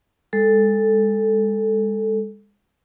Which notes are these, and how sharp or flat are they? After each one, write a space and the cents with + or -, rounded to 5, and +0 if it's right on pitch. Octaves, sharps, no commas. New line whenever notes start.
G#3 -35 A4 +0